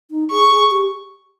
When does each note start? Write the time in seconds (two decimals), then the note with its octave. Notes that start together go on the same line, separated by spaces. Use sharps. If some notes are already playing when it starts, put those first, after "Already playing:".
0.11 D#4
0.30 G#4 C#6
0.51 G#4
0.71 G4